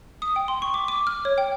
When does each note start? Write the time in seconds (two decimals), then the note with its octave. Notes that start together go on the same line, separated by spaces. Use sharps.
0.22 D#6
0.36 G5
0.48 C6
0.62 C#6
0.74 D6
0.88 D6
1.07 F6
1.25 C#5
1.38 G5